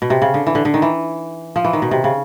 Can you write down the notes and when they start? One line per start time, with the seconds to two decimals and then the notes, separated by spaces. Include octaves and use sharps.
0.02 B2
0.10 C3
0.22 C#3
0.34 D3
0.47 E3
0.55 D3
0.65 D3
0.74 D#3
0.82 E3
1.56 F3
1.65 E3
1.73 D#3
1.82 B2
1.91 C3
2.04 C#3